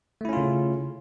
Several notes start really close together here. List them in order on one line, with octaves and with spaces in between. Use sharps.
A3 E4 C#4 F4 C#3